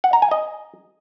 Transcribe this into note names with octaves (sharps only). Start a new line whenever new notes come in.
F#5
A#5
G#5
D#5